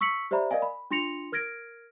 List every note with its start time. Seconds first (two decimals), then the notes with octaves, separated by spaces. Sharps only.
0.01 C#6 E6 B6 C#7 F#7
0.31 G4 C5 D5 E5 A#5 B5
0.51 A#4 D5 D#5 F5 G#5
0.62 B5
0.91 D4 F4 C6 A#6 C#7 F7
1.32 A#4 F6 G#6 A#6 D7